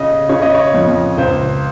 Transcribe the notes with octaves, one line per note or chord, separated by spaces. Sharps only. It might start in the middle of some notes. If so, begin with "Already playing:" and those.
Already playing: C#3 D#5
C#3 C#5
D#5
C#5
F2
C#2 C5